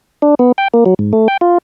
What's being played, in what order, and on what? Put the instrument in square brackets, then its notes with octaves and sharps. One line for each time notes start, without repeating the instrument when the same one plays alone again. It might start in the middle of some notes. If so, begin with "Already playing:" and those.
[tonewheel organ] D4
B3
G5
A#3
F#3
G#2
A3
G5
F4